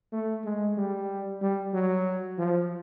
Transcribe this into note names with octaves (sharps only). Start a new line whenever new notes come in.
A3
G#3
G3
G3
F#3
F3